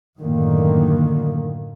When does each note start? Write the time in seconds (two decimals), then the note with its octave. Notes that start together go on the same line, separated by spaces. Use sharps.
0.19 F#2 A2 D3 D#3 A#3